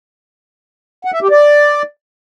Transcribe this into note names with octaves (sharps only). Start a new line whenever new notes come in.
F#5
E5
G4
D5